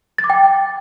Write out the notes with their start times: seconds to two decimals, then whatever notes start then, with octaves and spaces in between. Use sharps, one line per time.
0.18 A6
0.24 D6
0.30 G5